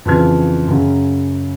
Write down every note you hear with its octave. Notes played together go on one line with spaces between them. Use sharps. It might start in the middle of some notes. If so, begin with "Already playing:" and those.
F2 C#3 E3 F4 F6 G#6
F#2 C#3 F#3 C#4